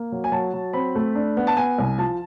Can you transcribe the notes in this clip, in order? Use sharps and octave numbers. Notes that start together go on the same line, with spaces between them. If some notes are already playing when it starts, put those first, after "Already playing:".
Already playing: A#3
F#3
G#5
F#3 A5
F#3
C4 B5
A3
D4
B3
A5
B3 G#5
C2
F3 A5